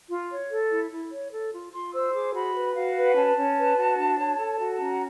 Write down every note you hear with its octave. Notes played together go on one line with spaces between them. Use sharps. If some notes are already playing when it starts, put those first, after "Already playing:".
F4
C#5
A4
E4
E4
C#5
A4
F4
F4 C6
C5 E6
G#4 D6
F#4 B5
B4
F#4 F5
B4
C#4 A5
C#4
B4
F#4
D4
C#5
A4
F#4
C#4 A#5